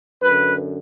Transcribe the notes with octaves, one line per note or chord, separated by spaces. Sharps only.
F#2 D3 B4